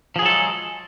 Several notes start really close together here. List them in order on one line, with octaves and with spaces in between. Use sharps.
F3 G#4 F#3 A4 G#3